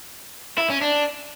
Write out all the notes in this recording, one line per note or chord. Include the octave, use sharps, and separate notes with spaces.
E4
C#4
D4